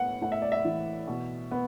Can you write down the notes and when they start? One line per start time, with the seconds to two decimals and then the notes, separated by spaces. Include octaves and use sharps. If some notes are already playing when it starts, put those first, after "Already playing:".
Already playing: A2 B3 F#5
0.21 A2 F#5
0.32 E5
0.42 D5
0.52 E5
0.65 E3
1.07 B2
1.51 B3